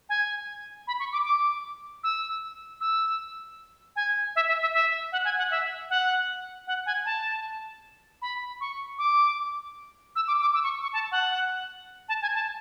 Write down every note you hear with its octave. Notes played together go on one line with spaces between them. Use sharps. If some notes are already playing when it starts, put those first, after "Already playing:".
G#5
B5
C#6
D6
D6
E6
E6
G#5
E5
E5
E5
E5
F#5
G#5
F#5
E5
F#5
F#5
G#5
A5
B5
C#6
D6
E6
D6
D6
E6
C#6
C#6
A5
F#5
A5
G#5
A5